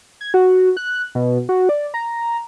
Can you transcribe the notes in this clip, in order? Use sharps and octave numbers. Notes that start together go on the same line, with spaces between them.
G#6
F#4
F#6
B2
F#4
D5
A#5